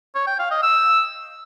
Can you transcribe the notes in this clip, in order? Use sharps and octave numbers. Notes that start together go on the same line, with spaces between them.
C#5
G5
F5
D#5
E6